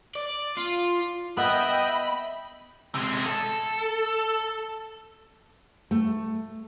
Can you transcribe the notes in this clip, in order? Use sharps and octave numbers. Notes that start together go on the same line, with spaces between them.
D5
F4
B3 D#5 E5 G5 B5
C3 G#3
A4
A3